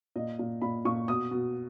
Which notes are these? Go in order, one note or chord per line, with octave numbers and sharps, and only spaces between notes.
A#2 D#5
A#2
A#2 B5
A#2 C#6
B2 D#6
B2